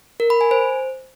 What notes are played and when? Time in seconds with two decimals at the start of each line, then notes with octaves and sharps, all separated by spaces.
0.20 A#4
0.30 B5
0.41 G#5
0.51 C5